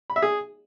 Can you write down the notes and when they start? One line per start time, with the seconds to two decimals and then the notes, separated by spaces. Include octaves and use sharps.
0.10 B5
0.16 E5
0.22 G#4